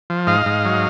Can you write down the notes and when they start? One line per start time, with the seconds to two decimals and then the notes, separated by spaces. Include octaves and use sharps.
0.10 F3
0.27 G#2 D#5 F5
0.46 G#2
0.65 F#3